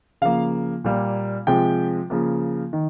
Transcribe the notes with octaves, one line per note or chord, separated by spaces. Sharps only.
C#3 F3 A#3 F5
A#2 G3 A#3
C3 F3 G#3 G5
C#3 F3 A#3
D#3